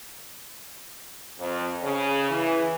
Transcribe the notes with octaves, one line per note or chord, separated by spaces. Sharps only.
F2
C#3
E3